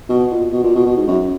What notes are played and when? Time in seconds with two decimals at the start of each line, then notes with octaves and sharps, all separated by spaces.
0.09 B2
0.31 A#2
0.52 B2
0.63 A#2
0.75 B2
0.86 B2
0.96 G#2
1.07 F#2